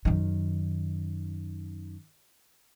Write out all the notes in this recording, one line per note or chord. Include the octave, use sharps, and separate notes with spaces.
F#2 D#3